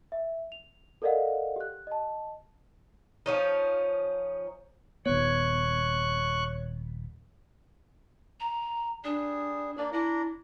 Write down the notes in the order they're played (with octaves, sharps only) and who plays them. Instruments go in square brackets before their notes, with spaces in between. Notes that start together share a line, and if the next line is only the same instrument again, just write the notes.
[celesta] E5
F7
A4 A#4 D5 D#5 F5 F#5
G4 F#6
D#5 A5
[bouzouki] F3 C#4 D#4
[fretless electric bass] D#1 B3 [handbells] C#5 [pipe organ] C#6 F#6
[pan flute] A#5
[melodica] G3 G#4 [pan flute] D4
[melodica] A#3 D4 [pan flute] D5
[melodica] D4 A#5 [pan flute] E4